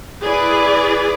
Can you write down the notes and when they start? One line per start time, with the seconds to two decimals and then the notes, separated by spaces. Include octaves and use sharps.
0.23 E4 G#4 B4 D5